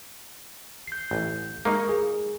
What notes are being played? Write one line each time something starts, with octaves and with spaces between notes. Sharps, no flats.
G6 C7
A1
G#3 A#3 D#4 A#4 C#6
G#4